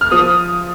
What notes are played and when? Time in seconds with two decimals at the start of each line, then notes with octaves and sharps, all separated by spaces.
0.01 F6
0.11 F3 D#6